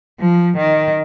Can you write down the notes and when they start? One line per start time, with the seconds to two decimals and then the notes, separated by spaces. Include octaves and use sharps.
0.20 F3
0.57 D#3